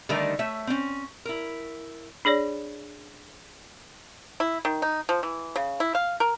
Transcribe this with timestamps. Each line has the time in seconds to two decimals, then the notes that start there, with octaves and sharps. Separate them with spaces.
0.09 D3 D#3 G3 A3 D#4 A#4
0.39 A3 C#5 E5
0.67 C4 C#4
1.25 E4 A#4
2.25 D4 G#4 C#5 D5
4.40 E4
4.65 D#3
4.82 D#4
5.09 F3
5.23 E3
5.56 C#3
5.80 E4
5.95 F5
6.20 A#4